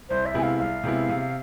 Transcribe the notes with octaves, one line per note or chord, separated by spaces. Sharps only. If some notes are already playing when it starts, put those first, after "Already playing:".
C2 C5
E5
C3 G#3 B3 E4 G#5
F5
C2 F5
C3 G#3 B3 E4
C3